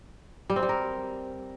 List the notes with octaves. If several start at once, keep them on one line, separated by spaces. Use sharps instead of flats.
G3
C4
G3
A#4